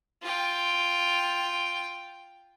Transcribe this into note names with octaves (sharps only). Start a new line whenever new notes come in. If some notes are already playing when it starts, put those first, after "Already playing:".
F4 G5